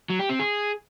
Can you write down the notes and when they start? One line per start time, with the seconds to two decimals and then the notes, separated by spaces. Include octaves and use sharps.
0.10 F#3
0.19 G4
0.29 C4
0.39 G#4